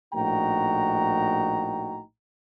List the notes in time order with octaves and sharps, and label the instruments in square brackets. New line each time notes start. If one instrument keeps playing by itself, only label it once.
[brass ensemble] A#1 A2 D#4 F#4 G5 A#5